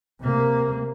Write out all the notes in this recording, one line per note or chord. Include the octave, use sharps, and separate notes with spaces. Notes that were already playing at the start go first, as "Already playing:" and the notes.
C3 A#3